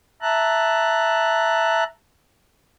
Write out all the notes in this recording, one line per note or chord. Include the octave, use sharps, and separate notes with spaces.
E5 A5 A#5 F#6